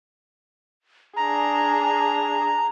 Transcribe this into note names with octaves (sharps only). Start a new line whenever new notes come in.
D4 G#4 A#5